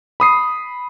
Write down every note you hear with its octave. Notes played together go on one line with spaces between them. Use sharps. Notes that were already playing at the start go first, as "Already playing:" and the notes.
B5 D#6 C7